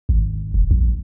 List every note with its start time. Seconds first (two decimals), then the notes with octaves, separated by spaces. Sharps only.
0.09 G#1
0.54 D#1
0.71 A#1